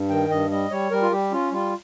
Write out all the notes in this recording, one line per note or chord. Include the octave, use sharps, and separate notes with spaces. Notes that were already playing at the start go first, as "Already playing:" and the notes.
Already playing: G2
D#3 G5
G2 D#5
G3 D#5
G3 C#5
G3 A#4
F4
G3 G4
C#4 F4
G3 F4